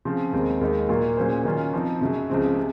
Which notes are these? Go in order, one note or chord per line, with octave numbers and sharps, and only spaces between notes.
C#3 F3 C4 F4
D#2 D#3 G#3 C4
D#2 D#3 G#3 D#4
A#2 F#3 A#3 F4
A#2 F#3 C#4 G#4 C5
D#3 F#3 C#4 F4
F3 C4 D#4
F#2 C#3 F#3
C#2 C#3 F3 G#3 C4
C3